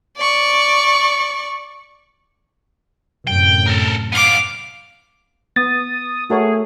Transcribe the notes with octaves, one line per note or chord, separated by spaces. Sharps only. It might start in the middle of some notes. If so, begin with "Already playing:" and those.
D5 C#6
F#2 A2 C3 G5
A4 A#4
B3 F4 F5 D6
B3 D#6 A6
A3 F#4 G#4 A#4 C#5